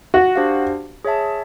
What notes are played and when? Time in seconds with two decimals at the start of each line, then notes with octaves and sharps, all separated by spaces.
0.14 F#4
0.36 D4 G4 C5 F5
1.05 G#4 C#5 E5 A5